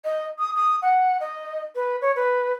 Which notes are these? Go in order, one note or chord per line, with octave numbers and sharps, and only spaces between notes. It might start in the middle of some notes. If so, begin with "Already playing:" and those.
D#5
D#6
D#6
F#5
D#5
B4
C#5
B4